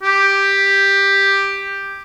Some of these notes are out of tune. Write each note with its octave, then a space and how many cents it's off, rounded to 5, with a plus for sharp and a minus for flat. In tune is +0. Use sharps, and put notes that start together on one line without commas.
G4 +10